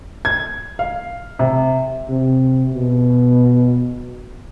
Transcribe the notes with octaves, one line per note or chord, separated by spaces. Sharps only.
G#6
F5
C3
C3
B2